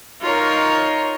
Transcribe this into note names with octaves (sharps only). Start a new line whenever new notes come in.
D#4 F4 A#4 C#5